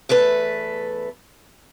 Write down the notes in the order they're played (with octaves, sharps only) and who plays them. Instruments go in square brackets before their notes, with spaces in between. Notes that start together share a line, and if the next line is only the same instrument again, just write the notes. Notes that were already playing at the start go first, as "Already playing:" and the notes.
[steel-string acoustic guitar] E2 A3 A4 B4